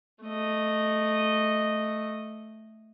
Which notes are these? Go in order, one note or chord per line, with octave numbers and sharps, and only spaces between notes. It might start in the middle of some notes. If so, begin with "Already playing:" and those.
A3 D#5